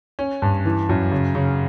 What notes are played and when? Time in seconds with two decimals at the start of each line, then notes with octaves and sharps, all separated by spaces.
0.19 C#4
0.42 G2
0.65 E3
0.89 F#2
1.11 C#3
1.35 C#3